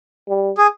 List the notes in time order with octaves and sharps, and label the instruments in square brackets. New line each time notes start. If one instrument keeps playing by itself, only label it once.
[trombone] G3
[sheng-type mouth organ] G#4